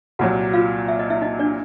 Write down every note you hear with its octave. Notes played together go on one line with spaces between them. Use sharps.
C2 A#2 F#3 F#4 F#5
F4 F5
E5
D#5
E4 E5
D#4 D#5
D4 D5